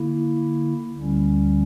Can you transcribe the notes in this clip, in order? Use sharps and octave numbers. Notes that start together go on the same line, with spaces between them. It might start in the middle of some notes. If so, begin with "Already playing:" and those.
Already playing: D3 A#3 E4
D2 D3 G3 C#4